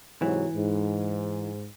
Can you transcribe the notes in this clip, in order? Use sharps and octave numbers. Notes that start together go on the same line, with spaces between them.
G#2 C3 E3 F#3
G#2